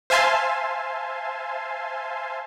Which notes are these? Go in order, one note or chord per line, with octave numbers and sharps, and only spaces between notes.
C5 E5 F5 G#5 A5 C6